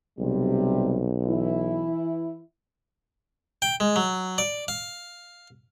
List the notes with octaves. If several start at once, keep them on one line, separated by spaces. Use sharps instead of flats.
B1 C3 G3
E3 E4
G5
G#3
F#3
D5
F5